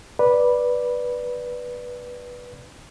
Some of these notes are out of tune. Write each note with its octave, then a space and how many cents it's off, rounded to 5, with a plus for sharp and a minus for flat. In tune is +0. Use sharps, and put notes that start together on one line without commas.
B4 -10 D5 +0